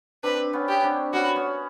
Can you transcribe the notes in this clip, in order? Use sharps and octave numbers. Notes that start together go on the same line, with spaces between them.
C4 D4 B4
B3 C#4
G4
C4 D4
B3 C#4 F#4
B3 C#4